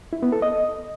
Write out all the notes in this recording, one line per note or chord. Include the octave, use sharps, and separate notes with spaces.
E4
B3
A4
D#5